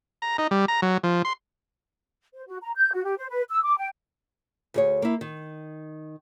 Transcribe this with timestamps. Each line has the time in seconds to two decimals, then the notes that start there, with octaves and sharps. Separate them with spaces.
0.22 A#5
0.38 D#4
0.51 G3
0.68 A#5
0.82 F#3
1.04 F3
1.25 C6
2.34 C5
2.47 F#4
2.62 A#5
2.76 G6
2.93 F#4
3.04 G4
3.18 C5
3.30 B4
3.50 E6
3.63 D6
3.78 G5
4.74 D2 G#4 C#5
5.02 A#3 E4
5.21 D#3